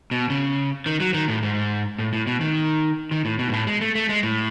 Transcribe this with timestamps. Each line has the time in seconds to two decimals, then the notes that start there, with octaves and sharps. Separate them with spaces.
0.11 B2
0.30 C#3
0.86 D#3
1.00 F#3
1.14 D#3
1.28 A2
1.43 G#2
1.99 A2
2.13 A2
2.27 B2
2.41 D#3
3.11 D#3
3.25 A2
3.39 B2
3.48 G#2
3.53 A2
3.67 G#3
3.81 A3
3.95 A3
4.09 G#3
4.23 A2